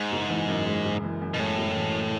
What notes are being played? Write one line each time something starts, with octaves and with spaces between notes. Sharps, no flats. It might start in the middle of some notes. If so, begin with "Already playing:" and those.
Already playing: G#2 G#3
F#1
E3
F#2
G#3
F#1
E3
F#2
B2
A2 G#3
F#1
E3